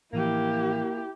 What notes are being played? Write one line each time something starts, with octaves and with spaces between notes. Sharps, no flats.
A2 E3 F3 A#3 E4 G4